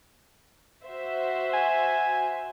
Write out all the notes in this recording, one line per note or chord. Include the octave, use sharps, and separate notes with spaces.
F#4 C5 E5
G#5